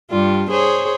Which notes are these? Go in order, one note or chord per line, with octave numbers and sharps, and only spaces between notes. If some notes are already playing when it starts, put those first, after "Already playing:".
G2 G3 F4
G#4 C5 C#5